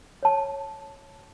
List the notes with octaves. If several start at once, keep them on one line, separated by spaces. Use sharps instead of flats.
C#5 A5